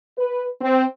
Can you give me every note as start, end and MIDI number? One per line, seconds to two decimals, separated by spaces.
0.18 0.45 71
0.61 0.84 60